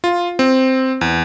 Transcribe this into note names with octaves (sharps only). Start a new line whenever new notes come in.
F4
C4
E2